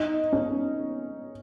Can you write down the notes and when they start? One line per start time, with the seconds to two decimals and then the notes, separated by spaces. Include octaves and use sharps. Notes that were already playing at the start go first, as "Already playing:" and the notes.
Already playing: D#4
0.33 C#4